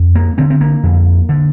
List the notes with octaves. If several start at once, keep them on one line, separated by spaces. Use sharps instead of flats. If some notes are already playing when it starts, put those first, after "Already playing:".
Already playing: F2
A#3
D3 C4
C4
A#3
F2
D3